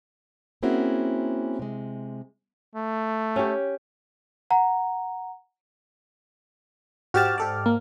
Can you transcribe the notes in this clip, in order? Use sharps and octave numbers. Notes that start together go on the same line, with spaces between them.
A#3 C4 C#4 E4 F#4 G#4
C3 G#3
A3
C#4 G4
F#5 A#5
G#2 F#4 G4 A5 F6 A6
G4 A4 D5
A#3